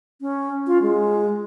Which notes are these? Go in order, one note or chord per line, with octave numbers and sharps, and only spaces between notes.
C#4
F4
G#3